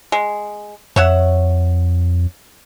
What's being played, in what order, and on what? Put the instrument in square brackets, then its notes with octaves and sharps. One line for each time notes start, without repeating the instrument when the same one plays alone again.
[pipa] G#3
[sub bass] F2 [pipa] C#5 E5 F#5